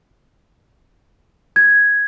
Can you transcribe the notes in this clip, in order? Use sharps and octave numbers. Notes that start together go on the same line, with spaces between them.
G#6